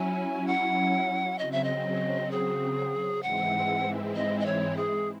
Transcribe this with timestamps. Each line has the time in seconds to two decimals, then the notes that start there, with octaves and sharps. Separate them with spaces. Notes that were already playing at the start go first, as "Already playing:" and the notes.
Already playing: F#3 C#4 E4 G#5
0.47 F#5
1.39 C#3 F#3 C4 D#5
1.52 E5
1.64 D#5
2.31 G#4
3.23 G#2 E3 G#3 C4 E4 F#5
4.16 D#5
4.40 D#5
4.46 C#5
4.77 G#4